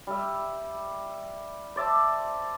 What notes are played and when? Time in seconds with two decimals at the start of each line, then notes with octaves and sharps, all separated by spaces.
0.07 G3 E5
1.76 C5 D5 E5 A5